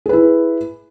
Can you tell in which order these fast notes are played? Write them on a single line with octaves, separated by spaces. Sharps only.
G#4 B4 E4